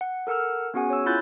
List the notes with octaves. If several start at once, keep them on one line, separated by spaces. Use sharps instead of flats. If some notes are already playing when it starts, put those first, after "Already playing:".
F#5
A4 A#4 F#5 E6 F6
B3 C#4 F#4 G#4 F#5 G#5
C#5 E6
E4 F4 B5 F#6 G6 A6